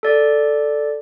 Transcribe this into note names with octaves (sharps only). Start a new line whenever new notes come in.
A4 D5